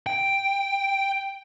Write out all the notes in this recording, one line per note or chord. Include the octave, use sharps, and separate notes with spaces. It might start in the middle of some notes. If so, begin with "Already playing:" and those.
G5